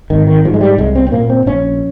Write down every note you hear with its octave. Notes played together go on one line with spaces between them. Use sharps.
G#1 D#3
D#3
G#2 F3
G#3
G3
C2 G#3
C4
C4
A#2 A#3
C4
A#1 C#4